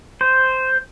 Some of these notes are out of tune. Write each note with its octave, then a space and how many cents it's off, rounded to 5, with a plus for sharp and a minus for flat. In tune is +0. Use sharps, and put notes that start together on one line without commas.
C5 -5